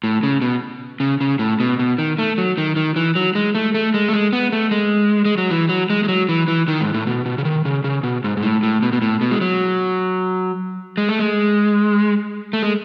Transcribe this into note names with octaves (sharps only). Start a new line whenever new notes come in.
A2
C#3
B2
C#3
C#3
A2
B2
B2
D#3
A3
F#3
D#3
D#3
E3
F#3
G#3
A3
A3
G#3
A3
G#3
B3
A3
G#3
G#3
F#3
E3
F#3
G#3
G#3
F#3
E3
E3
D#3
G#2
A2
B2
B2
C#3
D#3
C#3
C#3
B2
G#2
G#2
A2
A2
B2
B2
A2
B2
G#3
F#3
G#3
A3
G#3
A3
G#3